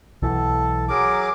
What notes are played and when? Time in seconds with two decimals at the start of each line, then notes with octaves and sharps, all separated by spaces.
0.22 B1 E3 A4
0.89 F#3 G#4 A#4 D6